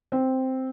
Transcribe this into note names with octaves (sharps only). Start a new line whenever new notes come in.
C4